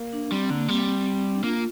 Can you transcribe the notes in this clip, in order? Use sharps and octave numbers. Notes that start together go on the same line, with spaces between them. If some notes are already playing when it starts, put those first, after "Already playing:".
Already playing: A#3
D4
G3 C4
D3 A#3
A#3
G3 C4
D4
A#3 F4